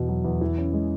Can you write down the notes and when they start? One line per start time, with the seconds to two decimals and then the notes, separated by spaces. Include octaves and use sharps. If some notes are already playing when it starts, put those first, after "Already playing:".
Already playing: E2 B2
0.09 F#3
0.25 E2
0.41 E3
0.58 C#4
0.73 G#3